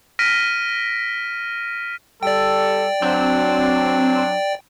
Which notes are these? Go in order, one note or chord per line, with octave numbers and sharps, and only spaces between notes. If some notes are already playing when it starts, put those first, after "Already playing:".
F6 A#6 B6 D7 D#7
G3 A4 D5 G5
F#3 C4 D4